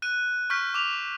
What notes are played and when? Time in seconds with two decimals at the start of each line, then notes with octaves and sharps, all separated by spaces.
0.02 F#6 D#7
0.50 C#6 F6 G6 B6
0.74 D6 F7